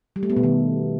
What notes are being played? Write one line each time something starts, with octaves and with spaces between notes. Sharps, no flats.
G3
A3
B3
B2
D#3